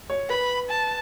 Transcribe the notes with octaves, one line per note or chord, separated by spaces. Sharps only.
C#5
B4 B5
A5